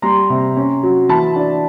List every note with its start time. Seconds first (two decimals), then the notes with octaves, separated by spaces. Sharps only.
0.02 G3 A#5 C6
0.30 C3
0.57 C#4
0.83 F#3
1.09 E3 A5 B5
1.36 D4